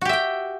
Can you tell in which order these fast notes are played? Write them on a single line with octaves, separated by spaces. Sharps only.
F#4 G4 E5 G5